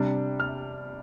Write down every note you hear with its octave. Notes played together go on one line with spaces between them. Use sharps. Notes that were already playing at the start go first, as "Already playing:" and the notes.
Already playing: C3 G3 D4
F6